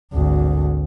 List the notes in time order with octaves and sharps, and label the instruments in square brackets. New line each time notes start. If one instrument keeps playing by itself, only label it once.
[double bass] G#1 D2